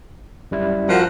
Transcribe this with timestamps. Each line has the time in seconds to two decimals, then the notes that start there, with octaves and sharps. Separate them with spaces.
0.51 F#2 G3 E4
0.89 F3 F#4 A#4 F#5